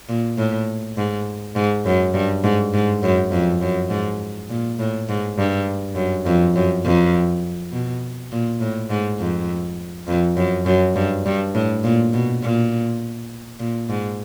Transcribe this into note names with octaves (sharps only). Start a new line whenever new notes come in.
A#2
A2
G#2
G#2
F#2
G2
G#2
G#2
F#2
F2
F#2
G#2
A#2
A2
G#2
G2
F#2
F2
F#2
F2
B2
A#2
A2
G#2
F2
F2
F#2
F#2
G2
G2
A2
A#2
B2
A#2
A#2
G#2